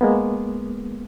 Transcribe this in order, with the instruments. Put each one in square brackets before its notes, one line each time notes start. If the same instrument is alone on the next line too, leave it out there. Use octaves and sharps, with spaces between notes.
[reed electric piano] G#3 A#3 B3